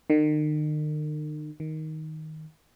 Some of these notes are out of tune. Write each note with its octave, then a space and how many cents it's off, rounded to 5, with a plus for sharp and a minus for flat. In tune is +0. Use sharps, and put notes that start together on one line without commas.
D#3 -40
D#3 +5